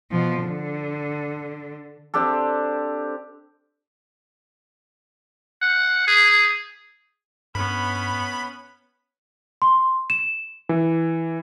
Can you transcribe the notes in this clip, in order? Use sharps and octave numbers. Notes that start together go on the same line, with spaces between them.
B2 F3
D3
C4 D4 G4 A4
F#5
G#4
G2 B3 C#4 B5
C6
E7
E3